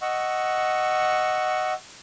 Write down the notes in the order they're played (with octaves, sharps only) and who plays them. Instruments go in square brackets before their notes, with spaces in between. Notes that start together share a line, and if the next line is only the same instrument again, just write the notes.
[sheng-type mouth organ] D#5 F#5 C#6 E6